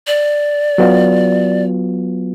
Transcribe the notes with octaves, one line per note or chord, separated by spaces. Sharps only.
D5
F#3 B3 F4